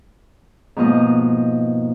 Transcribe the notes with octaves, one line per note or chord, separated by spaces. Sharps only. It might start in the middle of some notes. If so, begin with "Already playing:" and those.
G#2 B2 F3 A#3 D#5